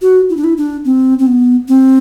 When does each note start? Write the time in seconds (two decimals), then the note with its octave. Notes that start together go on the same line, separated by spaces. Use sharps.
0.02 F#4
0.30 E4
0.37 D4
0.44 E4
0.57 D4
0.85 C4
1.19 C4
1.26 B3
1.68 C4